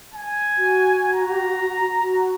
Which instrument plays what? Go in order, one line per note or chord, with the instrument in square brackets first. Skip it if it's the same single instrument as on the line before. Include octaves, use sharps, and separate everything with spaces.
[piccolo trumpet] G#5
[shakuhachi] F#4
[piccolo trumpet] A#5
[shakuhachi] F#4